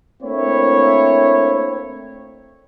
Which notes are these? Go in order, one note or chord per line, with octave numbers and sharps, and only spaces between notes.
A3 A#3 C4 D4 E4 C#5